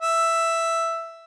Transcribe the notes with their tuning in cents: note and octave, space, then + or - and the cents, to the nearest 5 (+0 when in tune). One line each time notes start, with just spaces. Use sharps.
E5 +5